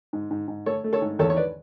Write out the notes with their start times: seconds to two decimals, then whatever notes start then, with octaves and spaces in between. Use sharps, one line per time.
0.13 G#2
0.31 G#2
0.48 G#2
0.66 A3 A4 C#5
0.84 A3
0.93 A4 C#5
1.02 G#2
1.19 E2 A4 C#5
1.30 C#5
1.37 B4 D5